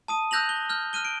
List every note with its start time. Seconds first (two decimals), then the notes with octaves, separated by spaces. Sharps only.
0.08 A5 D#6 D#7
0.31 E6 F#6 G6 A#6 F7 F#7
0.49 G7
0.70 F6 G6
0.93 F6 F#6 D#7 G7
1.05 D7